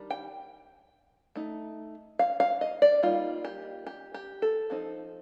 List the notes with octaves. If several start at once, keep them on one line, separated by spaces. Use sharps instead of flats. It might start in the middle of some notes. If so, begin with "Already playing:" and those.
Already playing: D#3 G3 D4
G5
A3 D#4
F5
F5
D#5
D5
G3 A#3 D#4 F4
G4
G4
G4
A4
F3 C4 D#4